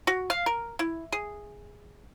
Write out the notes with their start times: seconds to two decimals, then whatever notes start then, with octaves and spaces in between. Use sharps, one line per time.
0.07 F#4
0.30 F5
0.46 A#4
0.79 E4
1.12 G#4